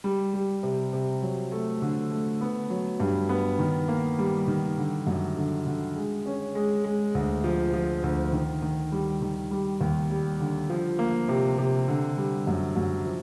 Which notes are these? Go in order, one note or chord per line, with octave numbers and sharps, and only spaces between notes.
G3
G3
C3
C3
F#3
A3
D3
A3
B3
F#3
G2
B3
D#3
A#3
G3
D#3
D3
F#2
D3
D3
G#3
C#4
G#3
G#3
D2
F3
F3
D2
D#3
D#3
G3
D#3
G3
D#2
G3
D3
F3
A#3
C3
C3
D3
G3
F#2
F#2
F3